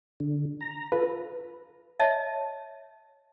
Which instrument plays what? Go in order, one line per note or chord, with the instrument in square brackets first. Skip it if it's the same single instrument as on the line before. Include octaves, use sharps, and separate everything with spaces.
[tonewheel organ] D3
A#5
[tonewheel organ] F4 A4 [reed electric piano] B4
[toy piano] C#5 D#5 E5 A5